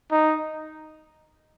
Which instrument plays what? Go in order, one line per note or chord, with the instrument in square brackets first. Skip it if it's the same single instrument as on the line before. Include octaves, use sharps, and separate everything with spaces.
[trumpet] D#4